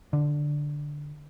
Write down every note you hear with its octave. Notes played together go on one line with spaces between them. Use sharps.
D3